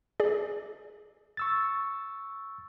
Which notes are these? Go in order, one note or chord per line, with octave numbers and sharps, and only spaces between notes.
G#4 D5
C#6 E6 A6